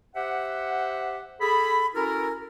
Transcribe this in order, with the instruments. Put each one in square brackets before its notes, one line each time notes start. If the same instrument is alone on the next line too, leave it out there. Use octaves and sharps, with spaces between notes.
[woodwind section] G4 C5 E5 F#5
G#4 A4 B5
C#4 E4 F#4 A4 A#4